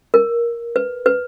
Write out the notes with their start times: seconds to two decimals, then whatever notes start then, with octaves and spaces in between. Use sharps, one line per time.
0.14 A#4
0.76 B4
1.06 B4